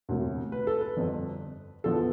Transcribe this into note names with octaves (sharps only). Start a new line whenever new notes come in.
E1 D2 C3
B4
A4
B4
G1 F2 D3
E2 D3 F3 B3 A4